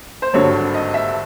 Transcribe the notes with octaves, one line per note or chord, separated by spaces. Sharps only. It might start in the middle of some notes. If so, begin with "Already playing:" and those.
C5
G#1 G2 D3 F#3 C#5
D#5
E5